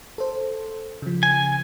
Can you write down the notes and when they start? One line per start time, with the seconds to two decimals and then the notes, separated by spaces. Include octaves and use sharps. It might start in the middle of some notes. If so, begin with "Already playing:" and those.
0.18 A4 C5
1.02 C#3 F3
1.23 G#5